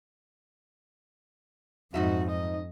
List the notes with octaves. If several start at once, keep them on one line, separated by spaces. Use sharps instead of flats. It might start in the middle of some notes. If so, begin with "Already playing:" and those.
F2 G#2 D#4 F#4 E5
D#5